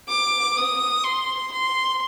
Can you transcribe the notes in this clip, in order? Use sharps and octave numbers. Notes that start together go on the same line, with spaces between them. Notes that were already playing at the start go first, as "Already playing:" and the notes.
D6
D#6
C6
C6